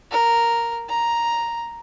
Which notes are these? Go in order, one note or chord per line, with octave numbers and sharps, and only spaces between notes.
A#4
A#5